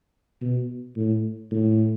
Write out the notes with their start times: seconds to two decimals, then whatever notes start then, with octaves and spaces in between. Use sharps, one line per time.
0.41 B2
0.96 A2
1.52 A2